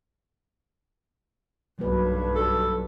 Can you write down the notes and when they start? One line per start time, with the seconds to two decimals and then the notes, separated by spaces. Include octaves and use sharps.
1.79 B1 G2 F#3 A#3 B4
2.36 A4